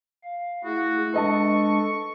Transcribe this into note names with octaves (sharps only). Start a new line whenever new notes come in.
F5
A3 E4 F#4 G#4
G#3 D4 A4 B4 D#5 A5 C#6